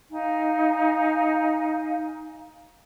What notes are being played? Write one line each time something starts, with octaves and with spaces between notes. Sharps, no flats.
D#4 F5 G#5